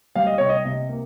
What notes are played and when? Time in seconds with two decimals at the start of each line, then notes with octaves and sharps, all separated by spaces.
0.16 G3 F5
0.26 D#5
0.38 C3 C#5
0.49 D#5
0.65 C3
0.89 A#3